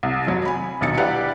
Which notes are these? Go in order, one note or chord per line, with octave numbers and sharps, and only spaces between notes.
C2
F2 F#3
G#5 B5
D#1 B1 D3 A6 C#7
E4 G4 B4 D5 F5 F#5